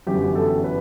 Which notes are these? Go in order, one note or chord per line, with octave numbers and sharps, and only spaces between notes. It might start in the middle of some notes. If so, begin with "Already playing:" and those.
G1 F#2 E3 G4
A4
B4